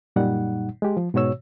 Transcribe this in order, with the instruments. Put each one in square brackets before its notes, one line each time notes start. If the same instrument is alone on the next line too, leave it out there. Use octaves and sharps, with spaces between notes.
[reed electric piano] F#2 A#2 G3 D#4 F#5
G#3 G4
F3
G#2 B2 F#4 C#5 E6